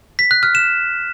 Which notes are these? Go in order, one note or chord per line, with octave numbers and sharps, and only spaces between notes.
B6
F#6
F6
E7